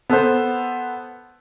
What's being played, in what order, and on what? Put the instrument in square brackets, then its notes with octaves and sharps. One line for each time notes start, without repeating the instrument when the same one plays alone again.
[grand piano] B3 A4 B4 C5